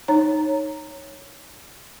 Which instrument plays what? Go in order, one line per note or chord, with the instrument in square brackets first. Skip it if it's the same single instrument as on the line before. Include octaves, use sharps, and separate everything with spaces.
[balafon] D#4 C#5 A#5